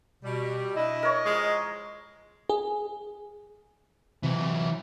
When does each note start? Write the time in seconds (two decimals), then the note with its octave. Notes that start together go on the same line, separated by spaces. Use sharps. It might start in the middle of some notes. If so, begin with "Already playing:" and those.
0.23 B2 G3
0.76 D4 E4 D#5
1.03 A#4 C#5
1.26 F3 G#3
2.49 G#4
4.23 C3 E3 F#3